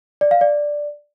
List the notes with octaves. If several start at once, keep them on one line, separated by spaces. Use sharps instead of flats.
D5
F5
D5